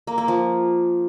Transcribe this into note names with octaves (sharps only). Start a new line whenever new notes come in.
A#3
A#3
F3